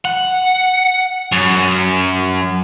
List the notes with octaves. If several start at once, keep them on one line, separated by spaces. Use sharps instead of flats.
F#5
F#2